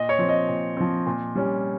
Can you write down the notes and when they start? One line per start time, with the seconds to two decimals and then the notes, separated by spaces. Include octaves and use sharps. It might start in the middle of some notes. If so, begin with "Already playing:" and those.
Already playing: A#2 D#5
0.09 C#5
0.19 F3 C4
0.29 D#5
0.48 A#2
0.77 F3 C4
1.06 A#2
1.35 G3 C#4